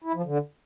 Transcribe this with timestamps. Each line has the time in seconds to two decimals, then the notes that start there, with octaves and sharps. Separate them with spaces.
0.04 E4
0.15 F3
0.25 D3